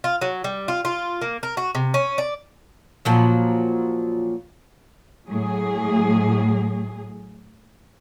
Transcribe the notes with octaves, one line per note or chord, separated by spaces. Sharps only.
F4
F#3
G3
F4
F4
A#3
A#4
F#4
C3
C#4
D5
A#2 F3 F#3
A2 F#3 G#4